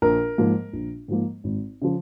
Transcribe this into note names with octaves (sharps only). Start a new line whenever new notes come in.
A#1 A#4
G#2 F3 A#3
A#1
G#2 F3 A#3
G#1
C#3 F3